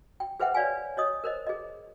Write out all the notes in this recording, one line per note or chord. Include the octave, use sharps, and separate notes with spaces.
G5
G#4 B4 C5 E5 F#5 G5
B4 C#5 D5 F5 G#5
C#5 D#5 D#6
A#4 C5 D#5
G#4 D#5